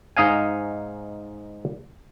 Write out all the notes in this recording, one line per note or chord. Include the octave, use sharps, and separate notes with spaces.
G#2 D#4 D#5 F5 G#5